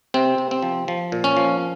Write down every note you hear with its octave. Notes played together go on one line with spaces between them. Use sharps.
C3 C4
C3
C4
F3
F3
A#2
C#4
F3